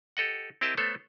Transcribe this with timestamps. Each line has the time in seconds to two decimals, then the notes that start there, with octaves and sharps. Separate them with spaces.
0.17 G4 A4 D#5 F#5
0.61 C4 E4 G4 A#4 D#5 A5
0.77 A3 B3 A4 C5 C#5